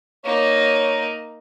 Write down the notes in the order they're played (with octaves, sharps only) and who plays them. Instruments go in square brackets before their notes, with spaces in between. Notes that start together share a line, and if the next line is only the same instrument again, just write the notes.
[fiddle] A#3 D#4 [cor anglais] C#5